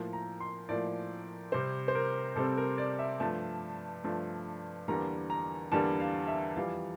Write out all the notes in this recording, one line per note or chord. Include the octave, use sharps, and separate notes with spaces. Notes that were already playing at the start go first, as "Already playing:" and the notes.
Already playing: A2 F3 A#3
A#5
C6
A2 F3 A#3 D5
C3 G3 C4 C5
C5
A#4
C3 G3 C4 A4
A#4
D5
E5
G2 F3 A3 A5
G2 F3 A3
E2 D3 G3 A#3 A#5
A#5
E2 D3 G3 A#3 A5
F5
E5
F2 E3 G3 F5